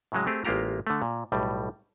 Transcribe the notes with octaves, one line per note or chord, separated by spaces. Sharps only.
A2 C#3 F#3 G#3
A3 C4 G4 G#4
A1 G#3 A#3 F4 G4 A#5
D3 A3
A#2
B1 A2 G3